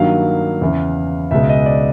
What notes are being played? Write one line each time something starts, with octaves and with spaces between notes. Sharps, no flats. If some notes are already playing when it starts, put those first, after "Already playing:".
Already playing: G2 D#3 F#3 A#3 F5
E2 C#3 E3
C#2 B2 G#3 E5
D#5
D5